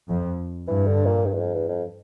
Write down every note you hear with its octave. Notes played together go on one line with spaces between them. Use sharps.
F2
G2 E3
D3
A#2
G2
E2
F2
E2
F2